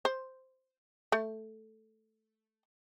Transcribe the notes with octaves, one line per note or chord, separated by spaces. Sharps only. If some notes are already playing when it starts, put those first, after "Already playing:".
C5
A3